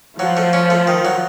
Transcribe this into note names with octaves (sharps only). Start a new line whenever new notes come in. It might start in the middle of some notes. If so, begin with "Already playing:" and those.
F3 F#3
A3
C#4
A3
D#3
F#3